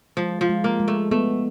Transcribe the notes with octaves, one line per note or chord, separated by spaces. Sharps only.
F3 G#3
F3
G#3
A#3
G#3
A3
A3 B3